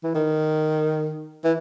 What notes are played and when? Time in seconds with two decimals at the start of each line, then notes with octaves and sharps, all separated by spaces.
0.03 E3
0.15 D#3
1.44 E3